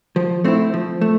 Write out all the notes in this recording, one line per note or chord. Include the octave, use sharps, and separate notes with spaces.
F3
A3 C4 E4
F3
A3